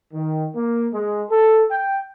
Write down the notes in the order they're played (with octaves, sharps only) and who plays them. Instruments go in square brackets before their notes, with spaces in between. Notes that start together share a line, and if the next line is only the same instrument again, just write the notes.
[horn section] D#3
A#3
G#3
A4
G5